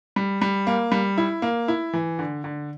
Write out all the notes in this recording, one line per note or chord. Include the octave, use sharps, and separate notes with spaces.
G3
G3
A#3
G3
E4
A#3
E4
E3
D3
D3